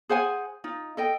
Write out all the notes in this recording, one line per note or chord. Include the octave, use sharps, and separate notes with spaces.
G#4 C5 F#5 G#5
D#4 F4
A4 D#5 G5